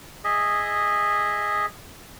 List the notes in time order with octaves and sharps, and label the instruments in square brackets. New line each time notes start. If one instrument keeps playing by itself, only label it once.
[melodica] G#4 D#5 E5